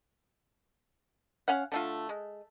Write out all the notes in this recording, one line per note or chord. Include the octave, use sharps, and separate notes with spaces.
C#4 F5 F#5
D3 A3 F4
G#3